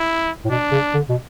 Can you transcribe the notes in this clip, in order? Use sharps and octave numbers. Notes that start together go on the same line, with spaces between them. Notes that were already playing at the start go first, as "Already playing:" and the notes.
Already playing: E4
A2
B2 D4
C#3
D3
B2